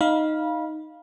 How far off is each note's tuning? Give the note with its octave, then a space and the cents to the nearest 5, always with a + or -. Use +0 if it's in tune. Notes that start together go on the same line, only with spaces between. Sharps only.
D#4 +0 F5 +0 B5 -25